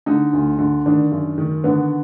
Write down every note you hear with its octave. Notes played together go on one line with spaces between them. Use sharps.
D3 D#4
D2
D3
D#3 D4
F#2
D#3
D3 B3